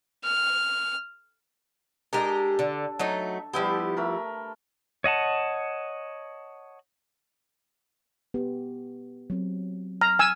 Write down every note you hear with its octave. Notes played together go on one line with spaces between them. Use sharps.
F6
G#3 D4 G4 A4 A#4
D3
F#3 A3 D#4
F3 G3 B3 E4 G4
A3 A#4 B5
C#5 D#5 F#5 A5
B3 G4
F#3 C4
A#5 F6
G#5 E6